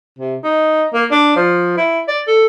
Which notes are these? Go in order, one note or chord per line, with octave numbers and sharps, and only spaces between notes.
C3
D#4
A#3
D4
F3
E4
D5
A4